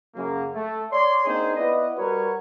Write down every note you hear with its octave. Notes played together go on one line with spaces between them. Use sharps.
F#2 C#3 A#3
A3
C#5 D5 C6
A#3 C4 D4 D#4 G#4 C5
B3 E4 B4 D5 D#5
G3 F#4 A#4 B4 C#5